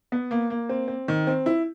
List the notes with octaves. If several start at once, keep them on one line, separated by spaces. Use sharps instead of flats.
B3
A#3
A#3
C4
C4
D#3
C4
E4